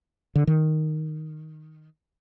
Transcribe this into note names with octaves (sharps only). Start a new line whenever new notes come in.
D3
D#3